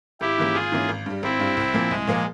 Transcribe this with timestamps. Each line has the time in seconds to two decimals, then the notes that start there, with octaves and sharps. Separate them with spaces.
0.21 G#1 E4 G4
0.38 G#2 E3 A#3 C#4
0.54 G#1 F4 G#4
0.72 G#2 E3 A#3 C#4
0.89 G#1
1.06 G2 G3
1.23 G#1 C4 E4
1.40 G2 G3
1.57 C2
1.74 A#2 F3 A#3
1.90 C2 G#3
2.07 A#2 F3 A#3